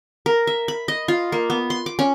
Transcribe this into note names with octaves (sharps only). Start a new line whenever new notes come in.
A#4
E5
B5
D#5
F4
A#3
B3
C6
D6
C#4